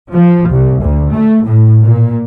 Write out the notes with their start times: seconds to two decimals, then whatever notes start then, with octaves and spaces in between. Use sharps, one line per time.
0.12 F3
0.49 C2
0.80 D2
1.13 A3
1.45 A2
1.82 A#2